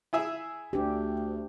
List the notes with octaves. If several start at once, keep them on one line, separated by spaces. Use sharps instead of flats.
E4 G#4 E5
D2 D4 G4